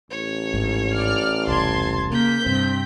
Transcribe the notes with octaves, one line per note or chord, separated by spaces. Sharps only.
A1 C#5
G#1 G#2
D5 F6
E1 C2 A5 C6 G#6
C#3 A#3 G6 B6
G2 C3 C4